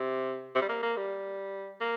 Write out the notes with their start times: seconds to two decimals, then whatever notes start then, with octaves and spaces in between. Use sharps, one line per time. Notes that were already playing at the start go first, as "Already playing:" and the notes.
Already playing: C3
0.55 C3
0.62 G3
0.69 A#3
0.82 A#3
0.97 G3
1.81 A#3